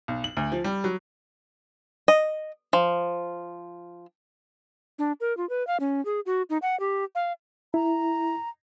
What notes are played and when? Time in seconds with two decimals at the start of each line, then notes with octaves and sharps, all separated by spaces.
0.08 B1
0.24 F#7
0.37 D2
0.52 F3
0.64 G3
0.84 F#3
2.08 D#5
2.73 F3
4.99 D4
5.20 A#4
5.37 F4
5.49 B4
5.67 F5
5.80 C#4
6.05 G#4
6.26 F#4
6.50 D#4
6.62 F#5
6.80 G4
7.15 F5
7.74 E4 A#5